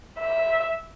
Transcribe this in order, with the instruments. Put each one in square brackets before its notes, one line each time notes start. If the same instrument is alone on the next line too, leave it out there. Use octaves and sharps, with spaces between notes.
[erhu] E5